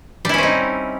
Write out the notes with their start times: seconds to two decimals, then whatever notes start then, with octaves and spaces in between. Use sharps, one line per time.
0.25 G3
0.29 E4
0.34 C#4
0.38 C4
0.43 D#4